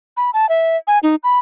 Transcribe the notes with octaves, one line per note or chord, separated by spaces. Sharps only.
B5
A5
E5
G#5
D#4
B5